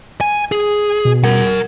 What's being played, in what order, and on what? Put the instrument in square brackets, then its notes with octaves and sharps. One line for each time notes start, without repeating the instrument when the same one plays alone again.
[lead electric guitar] G#5
G#4
[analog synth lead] B2
[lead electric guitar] A#4 F#5